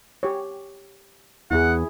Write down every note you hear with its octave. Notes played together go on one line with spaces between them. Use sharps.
G4 C#5
E2 E4 G#4 F#5